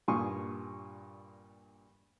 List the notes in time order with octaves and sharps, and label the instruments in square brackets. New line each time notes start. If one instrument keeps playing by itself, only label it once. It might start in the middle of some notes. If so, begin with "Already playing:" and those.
[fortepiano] G2 A#2 G#5 C6 C#6 D#6